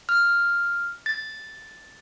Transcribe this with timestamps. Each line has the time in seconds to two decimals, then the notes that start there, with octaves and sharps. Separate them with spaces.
0.09 F6
1.06 A6